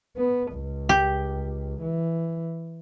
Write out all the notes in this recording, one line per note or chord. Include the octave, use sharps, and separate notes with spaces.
B3
C#2
G4
E3